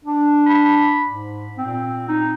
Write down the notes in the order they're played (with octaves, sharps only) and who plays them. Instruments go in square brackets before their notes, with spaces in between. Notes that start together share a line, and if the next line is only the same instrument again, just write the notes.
[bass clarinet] D4
[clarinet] B5
[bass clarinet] G#2
[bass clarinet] A#2 [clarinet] C4
[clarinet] D#4